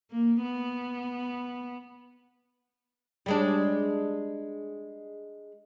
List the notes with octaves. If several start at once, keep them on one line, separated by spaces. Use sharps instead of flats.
A#3
B3
G3 G#3 D4